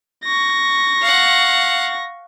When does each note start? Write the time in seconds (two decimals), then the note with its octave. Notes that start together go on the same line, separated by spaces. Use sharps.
0.24 C#6 A#6
1.02 F5 F#5